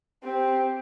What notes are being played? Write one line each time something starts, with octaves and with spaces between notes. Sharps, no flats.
C4 G4